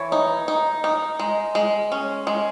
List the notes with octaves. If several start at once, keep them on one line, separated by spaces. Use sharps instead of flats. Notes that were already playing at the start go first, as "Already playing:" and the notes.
Already playing: E3 C#5
D#4
D#4
D#4
G#3
G#3
C#4
G#3